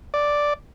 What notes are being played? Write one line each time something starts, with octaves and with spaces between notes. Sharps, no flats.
D5